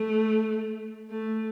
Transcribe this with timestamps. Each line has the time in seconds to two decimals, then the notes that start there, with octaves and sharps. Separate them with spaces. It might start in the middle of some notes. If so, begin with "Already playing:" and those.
Already playing: A3
1.10 A3